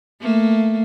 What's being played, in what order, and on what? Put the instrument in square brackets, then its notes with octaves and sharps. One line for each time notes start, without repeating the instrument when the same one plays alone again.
[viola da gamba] A3 A#3